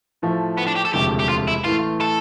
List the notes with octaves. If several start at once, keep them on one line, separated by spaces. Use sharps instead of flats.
A2 F3 A3
B3
D4
G4
A4
E1 D2 C3 F3 A3 G4
G4
F4
E4
A1 A2 E3 A3 F4
A4